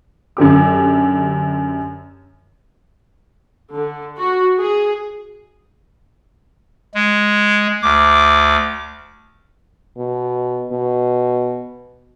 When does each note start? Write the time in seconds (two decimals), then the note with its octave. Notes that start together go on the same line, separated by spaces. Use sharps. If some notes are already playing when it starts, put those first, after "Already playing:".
0.37 F#2 D3 G4 D6
3.74 D3
4.19 F#4
4.58 G#4
6.94 G#3
7.82 D2 D6
9.98 B2
10.72 B2